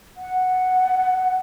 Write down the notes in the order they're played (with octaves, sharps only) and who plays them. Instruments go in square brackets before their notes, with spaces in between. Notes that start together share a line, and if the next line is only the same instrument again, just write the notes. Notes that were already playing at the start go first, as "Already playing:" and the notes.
[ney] F#5